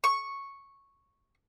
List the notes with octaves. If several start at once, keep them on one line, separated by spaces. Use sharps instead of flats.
C#6